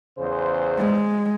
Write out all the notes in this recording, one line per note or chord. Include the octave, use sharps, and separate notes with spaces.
E2 C#3 C5
G#3